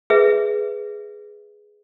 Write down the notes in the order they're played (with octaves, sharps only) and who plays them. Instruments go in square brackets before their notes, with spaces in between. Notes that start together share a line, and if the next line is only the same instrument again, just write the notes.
[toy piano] G#4 B4 E5